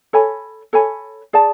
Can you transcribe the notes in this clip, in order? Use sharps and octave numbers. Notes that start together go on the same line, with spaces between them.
A4 C#5 G#5 B5
A4 C#5 G#5 B5
G#4 D5 A5